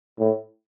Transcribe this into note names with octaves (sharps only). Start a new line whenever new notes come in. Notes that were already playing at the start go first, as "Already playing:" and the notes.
A2